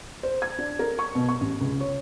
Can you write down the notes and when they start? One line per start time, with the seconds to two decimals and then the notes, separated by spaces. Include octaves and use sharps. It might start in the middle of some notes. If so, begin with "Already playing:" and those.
0.23 C5
0.42 G#6
0.59 D4
0.79 A#4
0.99 C#6
1.15 B2
1.28 C#6
1.41 A1
1.61 C#2
1.81 C#5